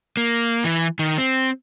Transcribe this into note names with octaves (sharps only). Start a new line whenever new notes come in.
A#3
E3
D#3
C4